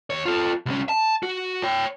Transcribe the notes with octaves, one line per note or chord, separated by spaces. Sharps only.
D#2 C#5
F4 A4
C2 C#4
A5
F#4
C#5 G5